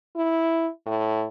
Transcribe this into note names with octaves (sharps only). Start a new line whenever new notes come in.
E4
A2